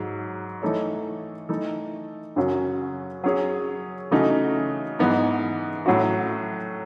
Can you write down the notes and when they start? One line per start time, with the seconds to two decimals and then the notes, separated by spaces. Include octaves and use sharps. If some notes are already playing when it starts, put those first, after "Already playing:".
Already playing: G#2 F#3
0.62 E3 A3 D#4 A4 C#5
1.49 E3 A3 D#4 A4
2.36 F#2 C#3 F#3 C#4 F#4
3.24 F#3 C#4 G#4 C#5
4.11 C#3 E3 A3 D#4 F#4
4.99 G#2 E3 B3 D#4
5.86 A2 F#3 C#4 F#4